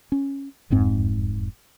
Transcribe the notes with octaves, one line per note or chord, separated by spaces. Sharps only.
C#4
E1 F2 G#2 C4